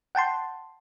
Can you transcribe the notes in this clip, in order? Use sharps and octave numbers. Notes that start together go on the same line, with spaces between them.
F#5 G5 A5 C6